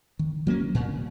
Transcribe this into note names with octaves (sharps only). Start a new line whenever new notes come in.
D#3
F#3 A#3 C#4
A#2